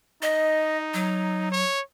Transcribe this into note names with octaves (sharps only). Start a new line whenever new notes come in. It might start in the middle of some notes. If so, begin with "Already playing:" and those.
D#4 D#5
F#3
C#5